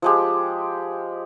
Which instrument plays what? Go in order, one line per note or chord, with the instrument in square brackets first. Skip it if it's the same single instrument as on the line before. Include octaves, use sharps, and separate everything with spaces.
[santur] F3 G#3 G4